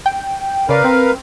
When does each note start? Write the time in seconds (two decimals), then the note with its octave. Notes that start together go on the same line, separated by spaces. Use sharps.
0.06 G5
0.69 C#3 A#4 B4 D5 F5
0.84 C4